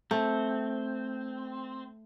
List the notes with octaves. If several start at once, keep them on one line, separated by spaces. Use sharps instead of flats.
A3 C4